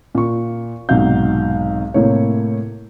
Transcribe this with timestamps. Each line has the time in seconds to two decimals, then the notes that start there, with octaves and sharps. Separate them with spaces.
0.15 A#2 C#6
0.89 B1 G#2 C3 F#4 F5 G6
1.94 A2 C3 A#3 C#5